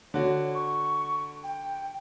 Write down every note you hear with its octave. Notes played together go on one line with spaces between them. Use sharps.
D3 F#4 C#5
C#6
G5